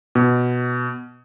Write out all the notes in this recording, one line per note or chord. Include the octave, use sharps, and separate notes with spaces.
B2